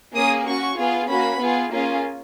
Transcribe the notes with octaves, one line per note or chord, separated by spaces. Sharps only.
A#3 C#4 G#4 D#6
C#4 F#4 C#6
B3 F4 G#4
A#3 C#4 F#4 B5
B3 F4 G#4
A#3 C#4 F4 G#4